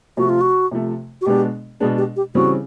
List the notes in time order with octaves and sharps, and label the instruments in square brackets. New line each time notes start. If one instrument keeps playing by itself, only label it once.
[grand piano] C3 F3 A3 [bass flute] F#4
[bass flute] F4
F#4
[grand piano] C3 F3 A3
[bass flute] F#4
[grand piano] B2 G#3 B3 D4 [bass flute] G4
[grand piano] B2 G#3 B3 D4 [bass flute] G#4
[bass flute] G4
G4
[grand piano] C#3 E3 G3 C4 [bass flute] F#4